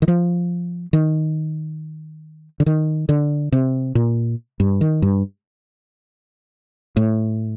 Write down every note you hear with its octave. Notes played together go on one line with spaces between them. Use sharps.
D#3
F3
D#3
D3
D#3
D3
C3
A#2
G2
D#3
G2
A2